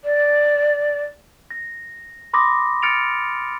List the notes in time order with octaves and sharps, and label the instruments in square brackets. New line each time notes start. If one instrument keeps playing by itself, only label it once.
[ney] D5
[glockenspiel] A#6
B5 C6 D6 D#6 A#6
F6 A6 C#7 D7 F7